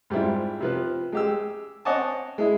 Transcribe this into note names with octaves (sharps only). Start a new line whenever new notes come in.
G#2 G3 C4 E4 F4
C3 F3 B4
G#3 G4 E6
C4 C#5 D#5 F#5 G#5 A5
G#3 E4